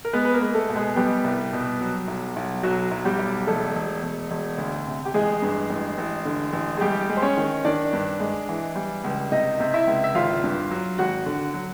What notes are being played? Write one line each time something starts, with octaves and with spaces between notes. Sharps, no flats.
A#4
G#3 B3 B4
B4
A#3 A#4
G#3
A3 A4
B2
G#3 G#4
G3 B3 G4
C2
B2
F#3
B1
B1
B1 F#3 F#4
B1
G3 G4
B1
E1 A3 A4
E1
E1
E1
D2
C3
G4
A1 G#3 G#4
G2
A1
A1
D3
A1
G#4
G3 G#3 G4
G#3
C5
C#4 C#5
D#3
D#3 D4 D5
G2
G#3
E3
G3
C#2
C3 D#4 D#5
C3
E4 E5
C#2
E5
G#1 F4 F5
G2
F#3
G#1 F#4 F#5
D3
F#3